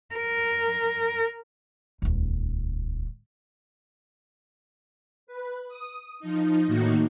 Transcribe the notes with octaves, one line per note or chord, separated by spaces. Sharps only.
A#4
D#1 C#2
B4
D#6
F3 D#4
A2 D#3 A#3 D#4 F#4